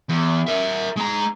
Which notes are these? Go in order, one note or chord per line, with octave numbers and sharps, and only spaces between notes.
E2
A#4 E5
G#3 A#5